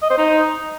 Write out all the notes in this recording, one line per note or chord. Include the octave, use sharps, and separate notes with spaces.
D#5
C5
D#4